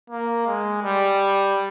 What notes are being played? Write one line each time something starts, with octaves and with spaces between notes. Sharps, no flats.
A#3
G#3
G3